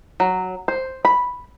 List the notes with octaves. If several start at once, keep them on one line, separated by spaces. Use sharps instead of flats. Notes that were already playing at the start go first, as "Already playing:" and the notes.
F#3
C5
B5